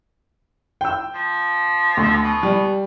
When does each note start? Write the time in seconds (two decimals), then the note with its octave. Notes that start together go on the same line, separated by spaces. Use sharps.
0.81 G5 E6
1.15 F3
1.97 D2
2.23 B2
2.43 G3